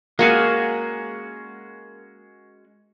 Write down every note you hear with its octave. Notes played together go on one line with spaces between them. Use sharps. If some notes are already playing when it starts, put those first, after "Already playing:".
G#3 A#3 C#4 F#4 G#4 F5